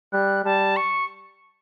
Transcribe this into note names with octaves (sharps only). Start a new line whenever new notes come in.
G3 F#6
G3 A5
C#6